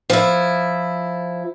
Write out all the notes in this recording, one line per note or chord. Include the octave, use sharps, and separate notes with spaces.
F3 E4